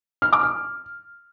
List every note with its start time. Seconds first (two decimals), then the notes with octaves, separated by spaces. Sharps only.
0.22 F6
0.33 D6
0.43 F6